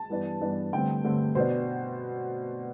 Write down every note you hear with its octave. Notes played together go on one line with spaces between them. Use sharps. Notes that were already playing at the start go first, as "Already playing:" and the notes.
Already playing: A5
G2 E3 B3 D4
G2 E3 B3 D4
G2 D3 A3 C4 G5
G2 D3 A3 C4
B2 B3 D4 C5